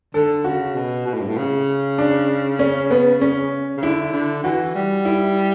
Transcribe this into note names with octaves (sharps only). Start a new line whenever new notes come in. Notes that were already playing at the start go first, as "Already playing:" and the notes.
D3 A4
C#3 F#4
B2
B2
A2
G2
A2
C#3
D4
C#4
B3
C#4
C#3
D3 E4
D3
E3 F#4
G3
E4